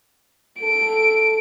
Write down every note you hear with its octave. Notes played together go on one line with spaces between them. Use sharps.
A4 D7